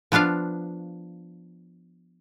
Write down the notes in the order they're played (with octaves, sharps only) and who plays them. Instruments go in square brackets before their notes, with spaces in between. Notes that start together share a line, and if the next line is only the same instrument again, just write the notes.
[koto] F3 B3 D4 F4 F5